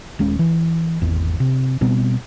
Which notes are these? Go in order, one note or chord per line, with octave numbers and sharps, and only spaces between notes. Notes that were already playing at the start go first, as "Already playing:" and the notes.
D#1 G#3 C#4
E3
G#1 E2
C3
B2 G3 B3 C4